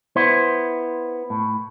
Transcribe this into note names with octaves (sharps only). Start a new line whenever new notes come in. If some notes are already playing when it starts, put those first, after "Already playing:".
B3 E4 C5
A2